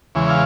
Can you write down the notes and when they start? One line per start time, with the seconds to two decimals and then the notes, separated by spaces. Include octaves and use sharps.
0.15 E2 C#3 E3 G#3
0.30 F5